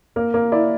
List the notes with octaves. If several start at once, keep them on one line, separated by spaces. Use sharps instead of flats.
A#3 A#4
A#3
E4 D5